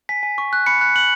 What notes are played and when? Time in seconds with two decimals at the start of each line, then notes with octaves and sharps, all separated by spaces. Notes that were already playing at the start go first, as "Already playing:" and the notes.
0.09 G#5 B6
0.23 G#5
0.38 C#6
0.53 F#6
0.66 B5 C#7
0.81 F#6
0.96 F#6 F#7